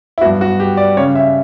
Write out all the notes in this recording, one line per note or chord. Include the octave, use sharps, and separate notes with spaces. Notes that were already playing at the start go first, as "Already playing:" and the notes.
E4
G2 F#3 B3 F#4
F#4
G4
D5
C#3 G3 C#4 C#5
E5